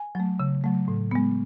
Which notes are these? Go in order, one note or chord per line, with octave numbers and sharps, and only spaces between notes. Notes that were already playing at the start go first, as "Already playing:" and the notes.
Already playing: G#5
F#3 A3
C#3
F#3 A3
A2
G#3 B3